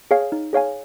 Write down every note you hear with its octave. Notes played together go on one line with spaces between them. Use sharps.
G#4 C#5 F5 G#5
D#4
G#4 C#5 F5 G#5